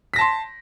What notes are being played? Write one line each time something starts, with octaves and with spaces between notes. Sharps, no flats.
A5 C6 A#6 B6